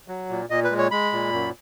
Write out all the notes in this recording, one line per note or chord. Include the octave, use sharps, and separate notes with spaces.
F#3
A#2
A#2 D#5
B4
G#3
C#5
G#3 B5
A#2
F#2